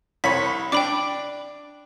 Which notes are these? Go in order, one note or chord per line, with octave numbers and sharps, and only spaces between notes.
C2 C#5 B5 B6
D4 G5 B5 D6